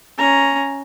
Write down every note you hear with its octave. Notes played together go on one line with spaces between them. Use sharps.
C#4 A#5